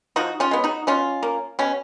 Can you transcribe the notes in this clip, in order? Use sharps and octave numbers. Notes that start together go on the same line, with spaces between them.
F3 D#4 F#4
C#4 F4
G#3 B3
D#4 F#4
B2 C#4 F4
A#3
B2 C#4